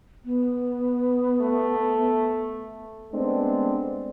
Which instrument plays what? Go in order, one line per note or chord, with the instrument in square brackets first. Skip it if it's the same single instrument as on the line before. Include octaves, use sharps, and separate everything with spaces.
[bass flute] B3
[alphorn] A3
[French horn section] G#3 A3 B3 C4 D4